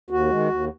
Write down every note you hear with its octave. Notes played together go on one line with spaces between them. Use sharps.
D#2 F#4
D#3 G#3
D#2